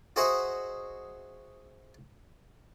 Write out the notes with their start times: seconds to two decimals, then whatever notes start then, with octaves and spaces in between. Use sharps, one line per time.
0.16 F#4 G#4 C5 D#5 E5 F#5